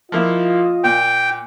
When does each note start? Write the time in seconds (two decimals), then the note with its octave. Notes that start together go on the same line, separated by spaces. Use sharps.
0.12 F3 A#3 E4 F4 D#5
0.84 A#2 G5